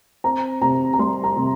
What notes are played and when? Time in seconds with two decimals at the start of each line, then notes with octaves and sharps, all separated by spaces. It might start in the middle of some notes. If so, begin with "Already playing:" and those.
0.24 C4 A#5
0.62 C3 A#5
0.94 A#5
0.99 G3 C6
1.24 A#5
1.36 C3